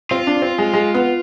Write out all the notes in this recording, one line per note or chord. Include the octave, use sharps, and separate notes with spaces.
C4 F4
D4
C4
G#3
G#3
B3